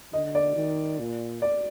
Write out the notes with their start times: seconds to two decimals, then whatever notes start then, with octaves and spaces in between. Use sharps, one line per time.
0.12 D3 D#5
0.35 D5
0.55 D#3
0.99 A#2
1.42 D5